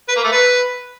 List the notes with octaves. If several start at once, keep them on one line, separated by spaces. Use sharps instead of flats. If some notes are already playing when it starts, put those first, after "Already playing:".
B4
A#3
A3
B4